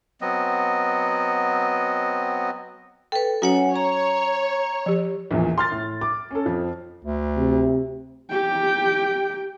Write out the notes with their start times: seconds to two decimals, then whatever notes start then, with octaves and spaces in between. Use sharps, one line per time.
0.21 F#3 B3 C4 D#5
3.12 A4 B4 G5
3.42 F#3 C#4 F#4 C#5 F#5 G#5
3.76 C#5 A#5
4.86 F3 G4
5.31 A#1 E2 A#2
5.58 C6 F6 A6
5.72 A2
6.01 D6
6.31 C#4 A4
6.46 F2 F3
7.05 D2
7.37 C3
8.30 G4 G5